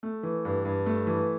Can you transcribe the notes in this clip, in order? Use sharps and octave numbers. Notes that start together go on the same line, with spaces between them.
A3
E3
G2
G2
A3
E3